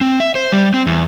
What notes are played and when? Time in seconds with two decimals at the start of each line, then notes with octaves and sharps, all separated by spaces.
0.01 C4
0.20 E5
0.35 C5
0.52 G3
0.74 C4
0.87 E2